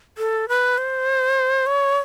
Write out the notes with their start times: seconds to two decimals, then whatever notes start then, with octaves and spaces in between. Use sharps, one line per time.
0.18 A4
0.49 B4
0.78 C5
1.66 C#5